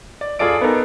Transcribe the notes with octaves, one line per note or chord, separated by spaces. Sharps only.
D5
F#2 F4 G#4 A4 D5 D7
B3 D#4 A4 A#4